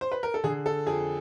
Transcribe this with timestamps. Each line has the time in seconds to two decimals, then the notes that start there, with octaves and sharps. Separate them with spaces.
0.01 C5
0.12 B4
0.23 A#4
0.34 A4
0.44 D3 G#4
0.66 A4
0.86 F2 G#4